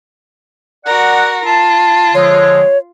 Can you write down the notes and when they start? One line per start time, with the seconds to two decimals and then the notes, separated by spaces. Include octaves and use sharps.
0.86 F#4 A#4 D5 F#5
1.45 F4 A5
2.15 D3 F3 G#3 C#5